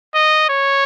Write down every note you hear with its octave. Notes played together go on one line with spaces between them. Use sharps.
D#5
C#5